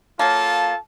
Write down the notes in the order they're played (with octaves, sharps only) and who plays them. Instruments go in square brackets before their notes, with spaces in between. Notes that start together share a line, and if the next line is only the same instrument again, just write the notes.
[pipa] F#3 A#3 [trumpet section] F4 A4 A5